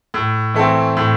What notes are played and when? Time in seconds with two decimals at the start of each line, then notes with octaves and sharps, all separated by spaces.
0.14 A2
0.54 E3 A3 C4
0.97 A2